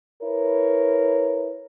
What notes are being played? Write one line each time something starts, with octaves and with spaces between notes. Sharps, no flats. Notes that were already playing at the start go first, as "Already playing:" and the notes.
E4 A#4 B4 C#5